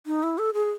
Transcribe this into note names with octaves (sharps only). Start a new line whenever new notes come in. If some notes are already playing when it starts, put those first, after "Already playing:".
D#4
E4
A4
G#4